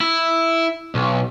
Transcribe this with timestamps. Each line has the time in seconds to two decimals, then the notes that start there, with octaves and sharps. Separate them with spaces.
0.01 E4
0.95 B1